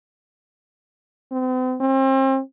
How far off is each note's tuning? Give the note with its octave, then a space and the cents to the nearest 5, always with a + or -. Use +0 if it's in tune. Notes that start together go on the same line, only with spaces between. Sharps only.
C4 -40
C4 +35